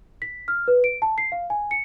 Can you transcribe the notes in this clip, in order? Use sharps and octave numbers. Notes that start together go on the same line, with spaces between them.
B6
F6
B4
D7
A5
C7
F5
G#5
C#7